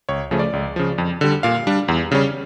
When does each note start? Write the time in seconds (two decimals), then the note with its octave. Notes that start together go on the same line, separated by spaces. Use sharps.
0.09 C#2 C#5
0.31 C#3 F3 A3 C#4
0.39 D5
0.53 C#2
0.76 C#3 F3
0.98 F2
1.21 D3 G3
1.43 A#2 F5
1.67 G3 D4
1.88 E2
2.11 C#3 G3 C#4